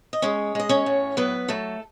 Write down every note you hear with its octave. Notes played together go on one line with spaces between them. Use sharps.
D#5
G#3 C#4 C#5
G#3 D#5
C#4 C#5
A2
F#3 B3 B4
F#3 A3 A4